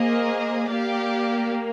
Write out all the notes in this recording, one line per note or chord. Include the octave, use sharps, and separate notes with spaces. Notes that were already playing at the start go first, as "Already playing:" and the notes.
Already playing: A#3 G#4 C5 D#5
A#3 G4 D5 F5